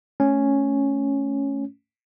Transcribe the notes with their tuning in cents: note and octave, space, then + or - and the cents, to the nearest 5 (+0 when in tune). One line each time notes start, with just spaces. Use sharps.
A3 +0 C#4 +0